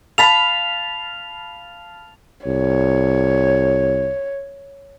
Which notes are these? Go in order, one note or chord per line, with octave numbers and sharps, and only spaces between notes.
F5 A5 B5 F7
C2 C#5